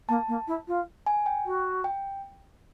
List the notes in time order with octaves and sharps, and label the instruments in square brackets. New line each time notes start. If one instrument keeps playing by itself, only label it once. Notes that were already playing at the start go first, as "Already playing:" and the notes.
[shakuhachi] A#3 [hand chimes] A5
[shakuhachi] A#3
E4
F4
[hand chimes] G#5
G5
[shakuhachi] F#4
[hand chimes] G5